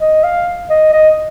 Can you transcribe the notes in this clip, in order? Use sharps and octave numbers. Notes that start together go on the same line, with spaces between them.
D#5
F5
D#5
D#5